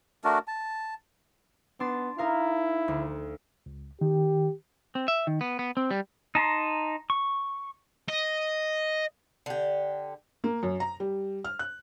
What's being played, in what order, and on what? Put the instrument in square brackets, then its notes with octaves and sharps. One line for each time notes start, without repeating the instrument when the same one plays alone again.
[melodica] A3 D4 F#4 A#4
A5
[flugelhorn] B3 [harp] D4 C6 A6
[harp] D#4 A#4 F5 [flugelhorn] E4
[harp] D2
[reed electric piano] C#2
[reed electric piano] D#3 [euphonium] G4
[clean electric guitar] C4
E5
D#3
B3
B3
C4
G3
[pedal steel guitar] D#4 A5 A#5 C6
C#6
[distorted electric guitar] D#5
[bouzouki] D3 G4
[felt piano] A#3
F#2
A#5
G3
F6
F#6